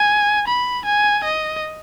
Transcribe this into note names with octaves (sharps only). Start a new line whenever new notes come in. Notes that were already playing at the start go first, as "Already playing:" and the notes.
Already playing: G#5
B5
G#5
D#5